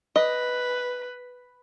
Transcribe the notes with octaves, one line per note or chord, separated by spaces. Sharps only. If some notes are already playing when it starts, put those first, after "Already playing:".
B4 D#5